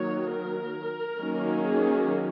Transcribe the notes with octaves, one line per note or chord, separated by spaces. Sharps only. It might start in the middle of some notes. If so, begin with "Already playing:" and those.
Already playing: D#3 F#3 A#3 C#5
A#4
D#3 F#3 A#3 C#4
G#4